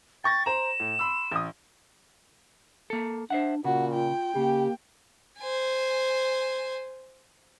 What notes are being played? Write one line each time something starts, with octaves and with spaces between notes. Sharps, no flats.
G5 C#6 A6 A#6
C5 A#5 E7
A2
B5 C6 E6
A1 D#6
A#3 A4
D4 C5 E5 F#5
A#2 C#3 F#4 F#5
F4 G5
C#3 A#3 G4
C5 G#5